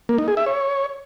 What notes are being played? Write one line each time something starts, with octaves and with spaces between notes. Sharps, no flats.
A#3
D#4
G#4
E5
C#5